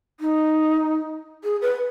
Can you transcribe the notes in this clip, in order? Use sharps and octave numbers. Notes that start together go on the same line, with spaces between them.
D#4
G#4
B4